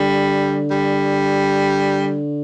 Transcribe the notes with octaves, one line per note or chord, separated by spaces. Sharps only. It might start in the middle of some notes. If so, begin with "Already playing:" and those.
Already playing: D3 G3
G3